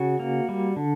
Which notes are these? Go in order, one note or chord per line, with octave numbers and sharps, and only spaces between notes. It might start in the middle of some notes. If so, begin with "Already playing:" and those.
Already playing: C#3 F#4
A#3
G3
D3